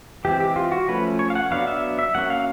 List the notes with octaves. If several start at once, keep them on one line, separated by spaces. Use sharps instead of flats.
E3 G#3 C4 G4
G4
F4
F#4
F3 A3 C#4 B4
C#5
F5
F#5
F#3 B3 D4 F5
E5
E5
F#3 A#3 C#4 F#5
F5